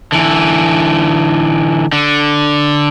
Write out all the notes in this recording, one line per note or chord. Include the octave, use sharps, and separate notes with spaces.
D3 E3
D3